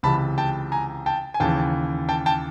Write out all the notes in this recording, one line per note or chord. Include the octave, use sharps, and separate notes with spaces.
C#2 C3 E3 A5 B5
G5 A5
G#5 A#5
G5 A5
G#5
D#2 C#3 E3 G5 A5
G5 A5
G5 A5